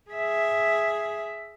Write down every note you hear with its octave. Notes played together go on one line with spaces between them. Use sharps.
G#4 E5